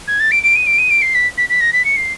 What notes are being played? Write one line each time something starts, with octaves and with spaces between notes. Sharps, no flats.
G#6
A6
D7
D7
D#7
D7
D#7
D7
C7
B6
B6
B6
A#6
B6
C#7
C7